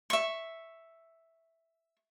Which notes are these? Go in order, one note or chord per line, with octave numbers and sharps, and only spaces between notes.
E5 C#6